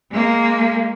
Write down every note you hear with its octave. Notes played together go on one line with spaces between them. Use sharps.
G#3 A#3